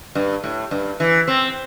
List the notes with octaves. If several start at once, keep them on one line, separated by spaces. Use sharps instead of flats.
G2
A2
G2
E3
C4